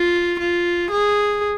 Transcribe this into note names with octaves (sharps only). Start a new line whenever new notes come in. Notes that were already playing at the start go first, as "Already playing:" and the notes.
Already playing: F4
F4
G#4